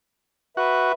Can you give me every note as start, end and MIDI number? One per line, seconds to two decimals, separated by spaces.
0.57 0.92 66
0.57 0.93 71
0.57 0.93 76